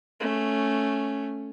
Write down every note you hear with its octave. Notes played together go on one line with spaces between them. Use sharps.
A3 C#4